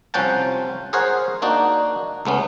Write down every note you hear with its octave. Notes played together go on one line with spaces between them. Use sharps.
C2 F3 C#4 F#5 G5 A5
G#4 A#4 C5 C#5 F#5
A#3 D4 D#4 F#4 D5
C#2 A3 B3 C#4